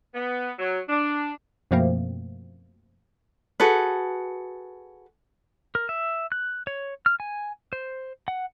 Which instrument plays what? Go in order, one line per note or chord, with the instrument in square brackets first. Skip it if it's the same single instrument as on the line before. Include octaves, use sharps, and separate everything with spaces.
[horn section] B3
F#3
D4
[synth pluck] F#2 B2 F3 A3 A#3 C4
[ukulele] F#4 G#4 A4 B4
[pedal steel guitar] A#4
E5
F#6
C#5
F6
G#5
C5
F#5